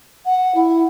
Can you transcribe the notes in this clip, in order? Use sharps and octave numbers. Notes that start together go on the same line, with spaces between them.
F#5
E4